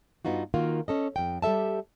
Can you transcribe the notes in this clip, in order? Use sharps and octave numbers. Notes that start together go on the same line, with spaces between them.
G2 B3 D#4 F4 F#4
D#3 A#3 F4 F#4
C#4 A4 D#5
F2 G5
G3 G4 A4 E5 A5